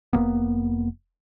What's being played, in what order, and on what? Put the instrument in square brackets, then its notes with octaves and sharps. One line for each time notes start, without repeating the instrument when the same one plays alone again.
[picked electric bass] F1 A#2 A#3 B3